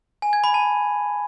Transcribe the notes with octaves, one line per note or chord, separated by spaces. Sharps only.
G#5
G#6
B5
A5